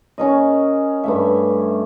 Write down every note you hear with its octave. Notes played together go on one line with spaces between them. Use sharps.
C#4 A#4 D#5
G2 A3 E5